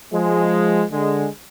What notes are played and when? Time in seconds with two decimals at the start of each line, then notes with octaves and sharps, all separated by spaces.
0.13 F3 G#3
0.92 D3 G#3